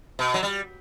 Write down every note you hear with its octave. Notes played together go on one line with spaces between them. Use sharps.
B2
F#3
G3